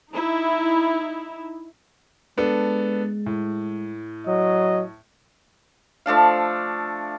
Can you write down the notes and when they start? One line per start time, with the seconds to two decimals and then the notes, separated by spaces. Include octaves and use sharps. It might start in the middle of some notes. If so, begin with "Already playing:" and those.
0.11 D#4 E4
2.38 G#3 B3 D4 A4
3.26 A2
4.27 F#3 D#5
6.06 F3 A3 D4 F5